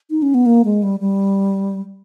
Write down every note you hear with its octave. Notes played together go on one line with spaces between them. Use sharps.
D#4
C#4
B3
A#3
G#3
G3
G3